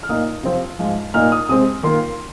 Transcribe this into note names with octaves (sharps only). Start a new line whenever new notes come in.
F6
A#2 A#3 D#4 D#6
C3 F3 C4
G#2 F3 G#3
A#2 A#3 D#4 F6
D#6
C3 G#3 C4 D#6
D#3 A#3 F4 C6